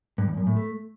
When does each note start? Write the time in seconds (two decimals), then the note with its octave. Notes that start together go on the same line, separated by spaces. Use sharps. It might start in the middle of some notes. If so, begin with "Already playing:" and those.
0.18 G2
0.28 E2
0.37 F#2
0.47 A2
0.56 A3